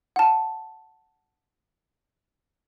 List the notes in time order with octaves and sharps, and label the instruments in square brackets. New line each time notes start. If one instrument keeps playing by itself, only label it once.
[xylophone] F#5 A5